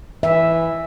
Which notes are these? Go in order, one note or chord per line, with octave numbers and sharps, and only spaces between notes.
E3 E5